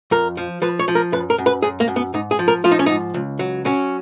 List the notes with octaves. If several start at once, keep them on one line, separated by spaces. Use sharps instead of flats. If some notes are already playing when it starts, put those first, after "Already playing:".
F2 A#4
F3
F3 B4
C#5
F3
A#4
F#2 B4
A#4
F#2
B4
F#2 G#4
A#3
F#2
B3
G#2 D#4
G#4
F3
A#4
F3 F4
D#4
C#4
G#2 D#4
C#2
F#3
F#3 C#4